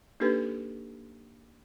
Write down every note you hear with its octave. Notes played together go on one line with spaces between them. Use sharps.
A#3 D4 D#4 G4 A4 B4